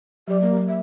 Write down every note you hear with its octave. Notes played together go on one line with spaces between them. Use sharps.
F#3 G4 D5
A#3
E5